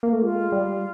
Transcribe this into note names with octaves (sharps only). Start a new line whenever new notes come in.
A#3
A3
G#3 F4
G3